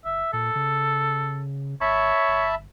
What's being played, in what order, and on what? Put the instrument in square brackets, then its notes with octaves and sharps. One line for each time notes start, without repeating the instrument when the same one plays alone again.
[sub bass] F#1 [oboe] E5
[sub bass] A#2 [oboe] A4
[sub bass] C#3
[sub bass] G#1 [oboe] C#5 [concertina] E5 A5 B5
[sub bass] G1